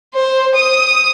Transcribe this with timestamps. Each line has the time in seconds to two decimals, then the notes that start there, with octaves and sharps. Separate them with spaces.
0.14 C5
0.55 D#6